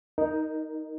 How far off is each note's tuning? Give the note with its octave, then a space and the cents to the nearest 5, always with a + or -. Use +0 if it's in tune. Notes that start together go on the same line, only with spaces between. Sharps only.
D#4 +10 A#4 +0 D#5 -15